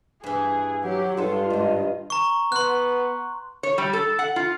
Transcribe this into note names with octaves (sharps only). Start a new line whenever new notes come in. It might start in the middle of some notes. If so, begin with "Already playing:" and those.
G2 E3 G#4
F#3 G4 F#5
G2 G#3 F4 A4 C6
G#2 D#3 D#5
A#5 C#6
B3 C6 F#6
C#5
G3
A4
F#5
F4